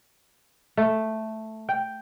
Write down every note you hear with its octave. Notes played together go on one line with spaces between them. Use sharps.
A3
G5